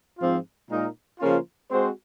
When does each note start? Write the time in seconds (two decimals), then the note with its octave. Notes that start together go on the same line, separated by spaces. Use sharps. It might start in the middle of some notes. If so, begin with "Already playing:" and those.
0.19 G#2 F3 C4 F4
0.69 A#2 G#3 D#4 A#4
1.19 C#3 F3 A#3 C#4 F4
1.70 G#3 C4 F#4 C5